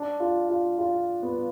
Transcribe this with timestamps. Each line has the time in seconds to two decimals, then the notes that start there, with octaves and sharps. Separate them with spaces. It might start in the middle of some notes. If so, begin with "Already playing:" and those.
Already playing: D4
0.20 F4
0.49 F4
0.78 F4
1.22 B3